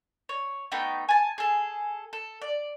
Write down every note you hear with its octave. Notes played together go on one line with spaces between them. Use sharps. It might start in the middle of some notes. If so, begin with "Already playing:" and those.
C#5
A3 B3 D#4 G5
G#5 A5
G#4 A4
A4
D5